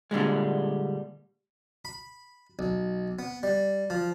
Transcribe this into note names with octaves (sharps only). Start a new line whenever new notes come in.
A#2 D3 G3 G#3
B5
B1
B3
G3
F3